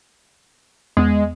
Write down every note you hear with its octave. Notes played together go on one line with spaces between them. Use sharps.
E2 G#3 B3